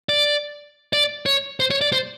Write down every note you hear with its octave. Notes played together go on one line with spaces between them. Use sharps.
D5
D5
C#5
C5
C#5
D5
C5